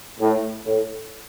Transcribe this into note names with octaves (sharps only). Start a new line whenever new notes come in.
A2
A2